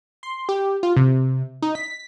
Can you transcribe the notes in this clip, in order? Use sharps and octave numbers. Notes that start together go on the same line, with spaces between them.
C6
G4
F4
C3
D#4
B6